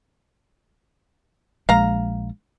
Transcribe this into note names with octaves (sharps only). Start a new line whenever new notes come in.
A#1 G#3 F5 A#5